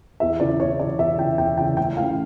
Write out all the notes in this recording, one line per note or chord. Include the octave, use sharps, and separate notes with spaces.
E2 E5
C#3 E3 D5
E2 C#5
C#3 E3 D5
E2 E5
C#3 E3 G5
E2 G5
C#3 E3 G5
A2 G5
E3 A3 C#4 F5